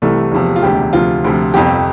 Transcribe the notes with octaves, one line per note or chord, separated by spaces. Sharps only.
C2 C3 E3 A3
E2 C3 F3
F4
E1 D2 C3 G4
D2 C3 F3 F4
D2 C3 F3
G1 F2 C3 G4